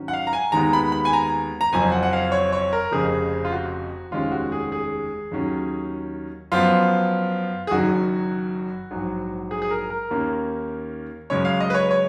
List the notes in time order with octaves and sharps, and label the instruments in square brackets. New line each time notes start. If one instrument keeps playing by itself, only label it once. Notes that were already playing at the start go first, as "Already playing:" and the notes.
Already playing: [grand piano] G#2 D#3 F#3 C#4
F#5
F5
A#5
G#5
D#2 D#3 G#3 B3 A#5
B5
B5
G#5
A#5
A#5
F#1 F2 F3 G#5
F#5
F#5
F5
C#5
C#5
A#4
F1 F2 C#3 G#4
F4
F#4
F1 D#2 D#3 G#3 C#4 F4
F#4
G#4
G#4
D#2 D#3 F#3 C#4
F#2 F3 B3 F4
G#4
F#1 F#2 D#3 F#3 F#4
A#1 G#2 F#3
G#4
G#4
A#4
A#4
D#2 D#3 A#3 C#4
F#2 C#3 G#3 C#4 C#5
F5
D#5
B4
C#5
C#5